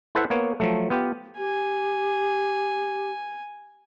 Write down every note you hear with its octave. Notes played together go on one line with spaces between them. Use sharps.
E4 A4 B4 C5 E5 F#5
A#3 B3 C#5
F3 F#3 A3
B3 F4 G4
G4 G#5